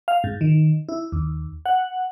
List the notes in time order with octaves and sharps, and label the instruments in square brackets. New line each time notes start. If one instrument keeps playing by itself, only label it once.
[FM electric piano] F5
G#2
D#3
E4
D#2
F#5